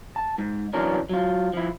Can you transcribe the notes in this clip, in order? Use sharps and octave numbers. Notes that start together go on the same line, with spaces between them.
A5
G#2
E3 F#3 C#4 D4 A#4
F#3 F4
F3 E4